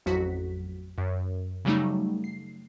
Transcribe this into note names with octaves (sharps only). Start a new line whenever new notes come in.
A1 F2 F#3 F#4 B6
F#2
C#3 F#3 G3 A3 D#4
C7